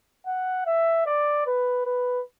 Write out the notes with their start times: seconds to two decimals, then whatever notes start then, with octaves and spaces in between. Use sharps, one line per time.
0.27 F#5
0.66 E5
1.06 D5
1.47 B4
1.86 B4